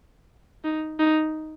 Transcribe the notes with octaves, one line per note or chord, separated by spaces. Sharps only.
D#4
D#4